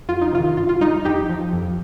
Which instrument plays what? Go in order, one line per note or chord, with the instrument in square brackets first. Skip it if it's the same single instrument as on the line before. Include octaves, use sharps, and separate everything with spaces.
[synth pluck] F2 F4
D#4
C3 D#3 F4
G2 F4
F4
G3 D#4
F2 D#4 G4
F3
F2